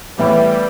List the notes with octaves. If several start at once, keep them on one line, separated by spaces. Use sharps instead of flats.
A2 E3 G3 B3